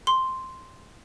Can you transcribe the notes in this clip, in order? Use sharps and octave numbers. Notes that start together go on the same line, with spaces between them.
C6